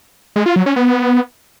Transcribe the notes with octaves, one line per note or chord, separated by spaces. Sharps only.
G#3
F4
F#3
C#4
B3